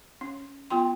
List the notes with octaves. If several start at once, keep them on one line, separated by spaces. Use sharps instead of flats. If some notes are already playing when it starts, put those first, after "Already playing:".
C#4
B3 F4 G5 C6